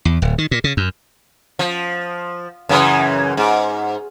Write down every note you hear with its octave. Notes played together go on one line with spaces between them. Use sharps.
E2
D1
D#3
A#2
C#3
F#2
F3
F#2 C#3 E3
G#2